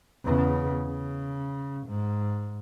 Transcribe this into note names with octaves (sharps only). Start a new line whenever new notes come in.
E2 C#3
C#3
G#2